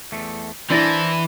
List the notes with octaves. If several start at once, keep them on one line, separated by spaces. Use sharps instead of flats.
E2 A3
E3 D4 E4 C5 A5 A#5